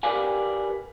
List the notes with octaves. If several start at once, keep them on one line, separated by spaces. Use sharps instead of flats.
G4 A#4 B4 D5 F5 G#5